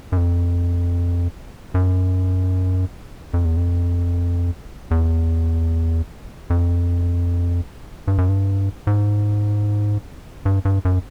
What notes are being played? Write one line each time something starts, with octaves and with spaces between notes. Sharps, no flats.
F#2
F2
F#2
F2
E2
F2
E2
F2
G2
F#2
G2
G#2
G2
G2
F#2